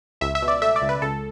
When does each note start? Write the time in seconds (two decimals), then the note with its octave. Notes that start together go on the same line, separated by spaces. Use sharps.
0.21 C#2 E5
0.35 E5
0.42 B2
0.48 D5
0.62 A3 E5
0.76 D5
0.82 C#2
0.89 B4
1.02 C#2 A4